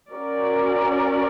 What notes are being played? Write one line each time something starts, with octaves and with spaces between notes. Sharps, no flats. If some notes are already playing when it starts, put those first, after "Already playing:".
C#4 F#4 A#4 D5